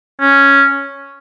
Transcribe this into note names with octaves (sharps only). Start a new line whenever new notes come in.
C#4